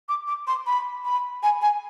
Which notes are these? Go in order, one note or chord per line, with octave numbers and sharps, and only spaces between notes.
D6
D6
C6
B5
B5
G#5
G#5